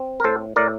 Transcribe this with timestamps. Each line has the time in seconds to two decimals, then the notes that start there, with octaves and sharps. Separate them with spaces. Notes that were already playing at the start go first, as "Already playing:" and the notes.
Already playing: C4
0.20 A#4
0.24 A2 A4 C5
0.56 A2 A#4 D5